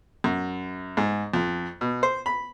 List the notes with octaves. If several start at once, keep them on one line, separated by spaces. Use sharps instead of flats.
F#2
G#2
F2
B2
C5
B5